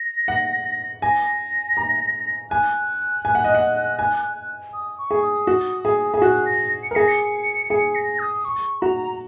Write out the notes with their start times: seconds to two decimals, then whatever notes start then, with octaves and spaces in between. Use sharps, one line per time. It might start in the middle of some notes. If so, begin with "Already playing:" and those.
Already playing: A#6
0.28 F#5
1.02 G#5 A#6
1.77 A#5
2.51 G#5 F#6
3.25 G#5
3.35 F#5
3.44 D#5
3.55 F#5
3.99 G#5
4.73 D#6
4.98 C#6
5.11 G#4
5.23 D#6
5.47 F#4
5.85 G#4
6.14 G#4
6.22 F#4 F#6
6.46 A#6
6.83 C#7
6.91 A#4
6.96 G#4 A#6
7.08 C#7
7.70 G#4 C#7
7.95 A#6
8.19 D#6
8.45 C#6
8.81 F#4 A#5